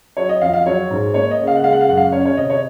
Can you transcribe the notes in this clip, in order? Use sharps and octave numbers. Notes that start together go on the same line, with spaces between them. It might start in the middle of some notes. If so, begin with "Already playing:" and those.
F#3 C#5
D#5
F2 F5
F5
F#3 C#5
G#2
A#3 C#5
D#5
C#3
F5
F#5
G#3 F5
F#5
F5
F#2 F#5
F5
C#4 C#5
C#5
C3 D#5
C#5